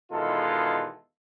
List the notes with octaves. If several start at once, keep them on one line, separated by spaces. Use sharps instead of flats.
E2 B2 D#3 G#3 F4 A4